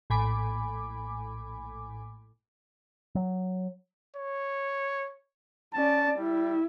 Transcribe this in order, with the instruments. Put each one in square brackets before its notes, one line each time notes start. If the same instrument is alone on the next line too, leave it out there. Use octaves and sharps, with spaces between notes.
[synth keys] A#1 A2 G#5 B5 D6
[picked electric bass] F#3
[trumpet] C#5
[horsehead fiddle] C#4 D5 [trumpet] A5
[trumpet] G3 [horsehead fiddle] E4